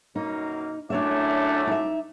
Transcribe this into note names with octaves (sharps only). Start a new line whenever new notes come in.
F#2 B2 A#3 D#4
F#2 A2 A3 D4 C#5 E5 D6
D#4 E5